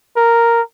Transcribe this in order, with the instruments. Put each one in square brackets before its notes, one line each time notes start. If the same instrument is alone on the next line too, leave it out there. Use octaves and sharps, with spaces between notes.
[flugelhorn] A#4